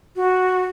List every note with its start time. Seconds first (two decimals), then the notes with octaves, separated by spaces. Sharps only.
0.16 F#4